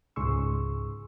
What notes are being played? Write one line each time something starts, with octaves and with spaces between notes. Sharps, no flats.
C#2 G#2 G#4 C6 C#6 E6